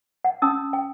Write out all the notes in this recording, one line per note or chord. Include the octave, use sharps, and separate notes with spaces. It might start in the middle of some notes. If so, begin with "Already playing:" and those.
F#5
C#4 A5 D#6 E6
G5